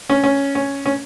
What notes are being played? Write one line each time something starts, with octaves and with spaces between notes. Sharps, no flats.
C#4
C#4
C#4
C#4